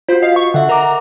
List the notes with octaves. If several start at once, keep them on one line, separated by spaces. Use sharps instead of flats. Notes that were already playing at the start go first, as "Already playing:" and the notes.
F4 F#4 C5
D#5 F5
C#6
D3 E5 F#5
A#4 A#5 D6